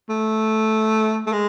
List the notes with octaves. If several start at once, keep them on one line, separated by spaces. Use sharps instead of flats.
A3
A3
G#3